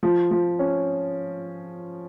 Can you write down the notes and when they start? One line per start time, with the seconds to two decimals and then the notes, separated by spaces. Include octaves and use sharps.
0.03 F3
0.31 F3
0.59 C#4